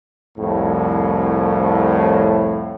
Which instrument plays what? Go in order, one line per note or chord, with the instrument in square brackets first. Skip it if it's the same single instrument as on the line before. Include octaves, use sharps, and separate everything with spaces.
[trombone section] C2 F2 A2